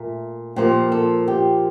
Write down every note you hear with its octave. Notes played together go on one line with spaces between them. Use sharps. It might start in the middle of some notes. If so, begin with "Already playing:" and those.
Already playing: A#2 A3
A#2 F3 A#3 G4
A4
G4